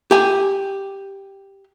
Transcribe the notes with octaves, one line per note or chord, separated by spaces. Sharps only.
G4 G#5